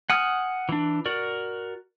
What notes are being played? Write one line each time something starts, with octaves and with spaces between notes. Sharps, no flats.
F#5 G#5 D#6 F6
E3 D4
F#4 A#4 D5